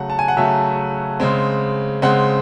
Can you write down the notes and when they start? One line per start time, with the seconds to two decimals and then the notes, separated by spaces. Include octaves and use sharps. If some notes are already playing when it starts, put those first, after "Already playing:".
Already playing: C#3 F#3 A3 F#5
0.10 A5
0.19 G#5
0.28 F#5
0.37 C#3 F#3 A3 E5
1.20 C#3 G#3 C4
2.02 C#3 G#3 C4 F#5